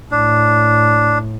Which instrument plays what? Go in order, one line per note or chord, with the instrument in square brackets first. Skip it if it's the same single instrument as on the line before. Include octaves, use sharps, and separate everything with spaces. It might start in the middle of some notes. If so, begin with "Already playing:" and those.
[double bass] A2 [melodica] D4